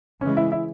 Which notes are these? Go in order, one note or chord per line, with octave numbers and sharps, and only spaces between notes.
C#3 E3 G#3 C#4
E4
E4